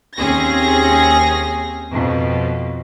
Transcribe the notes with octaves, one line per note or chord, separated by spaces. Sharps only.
D#2 C4 C#4 G#4 A#6
F2 B2